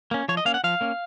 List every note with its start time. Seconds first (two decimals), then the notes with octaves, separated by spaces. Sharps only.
0.11 A#3 C#4
0.28 F3 C#5
0.37 D#5
0.45 A#3 C#4 F5
0.54 F#5
0.64 F3 F5
0.81 A#3 C#4